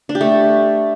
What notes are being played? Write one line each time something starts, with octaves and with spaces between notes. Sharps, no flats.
D4
G4
A3